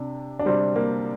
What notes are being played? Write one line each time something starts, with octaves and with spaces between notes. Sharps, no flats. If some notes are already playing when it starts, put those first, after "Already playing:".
Already playing: C3 D4
D4
C3 G3 C4
A#3